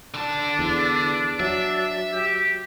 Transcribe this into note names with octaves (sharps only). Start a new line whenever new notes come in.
D3 D4 A5
E2
F#3 E5
G4